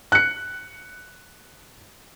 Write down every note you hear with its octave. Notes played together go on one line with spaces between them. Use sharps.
F#6 C#7